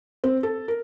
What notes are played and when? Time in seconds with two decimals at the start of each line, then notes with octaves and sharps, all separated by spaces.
0.24 C4
0.43 A4
0.68 A#4